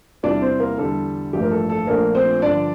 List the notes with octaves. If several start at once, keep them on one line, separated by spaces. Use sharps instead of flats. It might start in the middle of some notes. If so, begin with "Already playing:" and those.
E2 C3 E3 G3 D4 D5
C4 C5
A#3 A#4
E2 D3 G3 D4 A4
A1 G2 F3 A#3 G4
A#4
A4
A4
A#1 A#2 A3 A#3 D4 A#4
C4 C5
G2 D3 F3 D4 D5